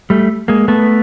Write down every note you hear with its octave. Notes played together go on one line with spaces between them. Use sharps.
G3 A3
G#3 A#3
A3 B3